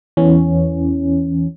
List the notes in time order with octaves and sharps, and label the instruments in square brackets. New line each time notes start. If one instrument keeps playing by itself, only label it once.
[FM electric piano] E2 E3 C#4